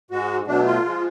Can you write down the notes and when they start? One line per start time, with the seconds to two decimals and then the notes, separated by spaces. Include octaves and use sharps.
0.11 G#2 G#3 F#4
0.47 B2 F#3 A3 D4
0.66 F4
0.84 F3 G#3